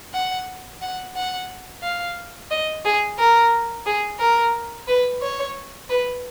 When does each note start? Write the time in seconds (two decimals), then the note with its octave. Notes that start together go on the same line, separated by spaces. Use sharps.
0.13 F#5
0.81 F#5
1.16 F#5
1.82 F5
2.50 D#5
2.85 G#4
3.19 A#4
3.86 G#4
4.20 A#4
4.88 B4
5.22 C#5
5.90 B4